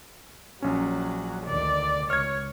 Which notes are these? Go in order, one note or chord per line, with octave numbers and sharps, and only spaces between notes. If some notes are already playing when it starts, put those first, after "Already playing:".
A#1 F#3 C#4
D2 D#3 D5
C#2 C#5 F6 G#6